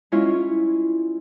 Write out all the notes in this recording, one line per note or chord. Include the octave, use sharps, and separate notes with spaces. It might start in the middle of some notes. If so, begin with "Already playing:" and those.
G#3 C#4 E4 F4